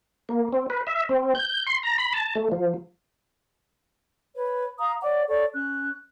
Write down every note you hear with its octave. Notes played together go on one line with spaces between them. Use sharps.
A#3
C4
B4
E5
C4
G6
C6
A#5
B5
A5
A3
F3
B4 C#5
F5 A#5 D#6
C#5 D5 F#5 D6
A4 C#5 D5 C#6
C#4 F#6